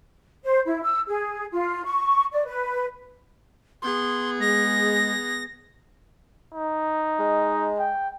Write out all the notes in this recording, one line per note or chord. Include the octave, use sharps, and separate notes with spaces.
C5
E4
E6
G#4
F4
C#6
D5
B4
B3 G#4 C6
G#3 A#6
D#4
G#3
G5